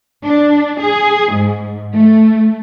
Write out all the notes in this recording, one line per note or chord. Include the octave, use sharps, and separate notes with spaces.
D4
G#4
G#2
A3